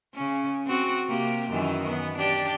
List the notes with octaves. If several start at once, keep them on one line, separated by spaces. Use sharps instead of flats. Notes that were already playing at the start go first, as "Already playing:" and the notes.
C#3 C#4
C4 F#4
C3 A#3 G4
F#2 D#3 E3
B3
D4 G4 D5